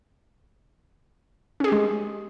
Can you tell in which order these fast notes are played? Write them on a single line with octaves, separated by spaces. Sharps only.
C#4 G#4 G4 G#3